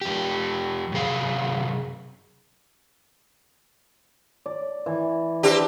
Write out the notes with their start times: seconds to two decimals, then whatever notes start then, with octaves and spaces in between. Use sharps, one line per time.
0.01 F2 G4
0.92 F#2 C3 G#4 F5
4.46 D5
4.86 E3
5.43 C4 D4 G4 B4